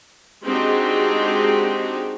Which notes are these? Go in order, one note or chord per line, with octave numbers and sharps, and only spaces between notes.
G#3 C4 D4 D#4 F#4 G4